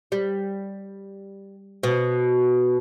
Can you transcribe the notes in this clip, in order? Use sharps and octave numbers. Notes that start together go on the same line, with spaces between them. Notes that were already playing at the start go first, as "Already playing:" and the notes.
G3
B2